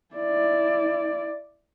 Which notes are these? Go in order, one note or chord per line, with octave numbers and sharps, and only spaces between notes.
E4 D5